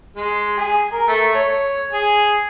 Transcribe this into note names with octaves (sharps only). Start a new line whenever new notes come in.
G#3
G#4
A#4
A3
C#5
G#4